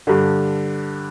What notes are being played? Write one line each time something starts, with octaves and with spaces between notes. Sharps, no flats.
G2 D3